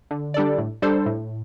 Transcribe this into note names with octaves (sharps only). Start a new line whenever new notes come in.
D3
G3 D4 A4 D5
A2
G3 D4 A4 C5
A2